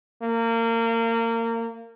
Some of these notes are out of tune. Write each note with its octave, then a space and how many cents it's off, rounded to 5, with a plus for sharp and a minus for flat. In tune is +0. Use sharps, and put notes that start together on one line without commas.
A#3 -25